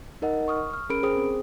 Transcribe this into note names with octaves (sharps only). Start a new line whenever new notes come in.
D#4 A#4 D#5 F#5
C#6 D#6 F6
F6
C#4 G#4 A#4 B5 D7
G#4 C5 G5 D#6
C4